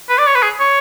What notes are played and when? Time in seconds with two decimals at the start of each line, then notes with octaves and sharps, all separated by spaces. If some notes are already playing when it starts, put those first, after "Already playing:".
0.09 B4
0.18 D5
0.27 C#5
0.35 B4
0.43 G#4
0.60 C#5